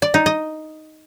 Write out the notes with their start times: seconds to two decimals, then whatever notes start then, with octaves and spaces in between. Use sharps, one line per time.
0.02 D5
0.14 D#4
0.26 D#5